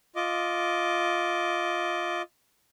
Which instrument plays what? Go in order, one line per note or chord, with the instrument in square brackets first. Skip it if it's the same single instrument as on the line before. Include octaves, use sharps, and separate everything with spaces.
[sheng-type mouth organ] F4 D#5 D6